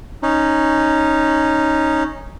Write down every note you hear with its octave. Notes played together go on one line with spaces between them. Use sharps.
C#4 D#4